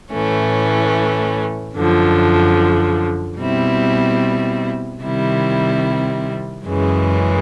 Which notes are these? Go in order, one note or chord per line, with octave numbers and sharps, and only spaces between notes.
A2 E3 A3 C#4
F#2 D3 F3
B2 G3 C4 E4
C3 D#3 G3 C4 E4
F#2 C#3 E3 G#3